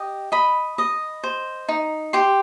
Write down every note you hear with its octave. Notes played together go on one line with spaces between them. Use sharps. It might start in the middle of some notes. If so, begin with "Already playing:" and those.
Already playing: G4 D#5
D#5 B5
D#5
C5
D#4
G4 C6